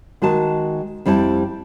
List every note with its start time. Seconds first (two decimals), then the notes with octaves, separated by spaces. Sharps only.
0.22 D#3 G#3 F#4 A5
1.06 F2 G3 C4 E4 A5